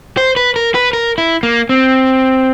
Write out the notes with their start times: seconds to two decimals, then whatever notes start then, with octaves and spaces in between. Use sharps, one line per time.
0.17 C5
0.36 B4
0.56 A#4
0.75 B4
0.93 A#4
1.18 E4
1.43 A#3
1.69 C4